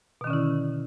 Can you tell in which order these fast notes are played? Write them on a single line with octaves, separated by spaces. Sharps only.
B2 D#3 C#4 D3 E4